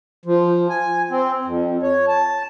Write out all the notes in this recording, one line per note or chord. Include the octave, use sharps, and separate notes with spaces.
F3
G#5
C4
F2
C#5
A5